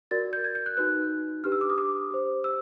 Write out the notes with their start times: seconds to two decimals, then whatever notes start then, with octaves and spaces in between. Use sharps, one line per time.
0.11 F#4 A#4 D5 A6
0.33 G6
0.44 G#6
0.55 G6
0.66 F#6
0.77 D#4 F#4 B4 F#6
1.44 D4 G4 B4 F6
1.52 E6
1.61 D6
1.70 D#6
1.78 D6
2.11 G4 C5
2.44 E6